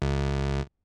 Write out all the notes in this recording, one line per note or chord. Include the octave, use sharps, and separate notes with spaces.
C#2